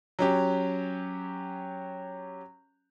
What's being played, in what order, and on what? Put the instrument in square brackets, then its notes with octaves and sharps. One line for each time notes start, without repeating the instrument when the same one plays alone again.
[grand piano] F#3 C#4 G4